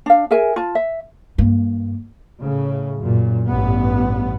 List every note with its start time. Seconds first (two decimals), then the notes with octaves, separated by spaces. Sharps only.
0.06 D4 F5
0.31 G#4 A#4 E5 G#5
0.56 F4 A5
0.75 E5
1.38 G2 A#3
2.41 A2 C#3
2.99 F#2 A#2
3.47 A1 G2 B3